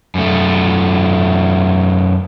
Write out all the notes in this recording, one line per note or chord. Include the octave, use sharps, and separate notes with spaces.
F#2 A3